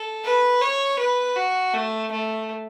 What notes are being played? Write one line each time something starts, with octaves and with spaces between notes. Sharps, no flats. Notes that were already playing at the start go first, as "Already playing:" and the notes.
Already playing: A4
B4
C#5
B4
F#4
A3
A3